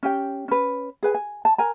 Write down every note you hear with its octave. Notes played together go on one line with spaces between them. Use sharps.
C#4 G4 G5
C#4 B4
G#4 B4 G#5
G#5
A5
A#4 G#5 A#5